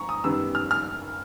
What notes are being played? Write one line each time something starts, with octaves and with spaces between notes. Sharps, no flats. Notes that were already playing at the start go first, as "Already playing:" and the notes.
Already playing: A#5 C#6
D#6
F#2 D#3 G3 B3 E6
F6
F6